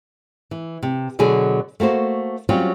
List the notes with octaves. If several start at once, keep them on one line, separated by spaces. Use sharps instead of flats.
E3
C3
B2 D3 F#3 G#4
A3 A#3 F#4 C5
F#3 G3 C4 C#4 F4